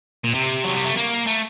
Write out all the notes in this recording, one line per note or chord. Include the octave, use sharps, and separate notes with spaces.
A#2
C3
F#3
G3
A3
A#3
A3